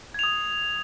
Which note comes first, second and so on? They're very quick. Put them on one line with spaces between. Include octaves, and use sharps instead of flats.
G#6 F7 D#6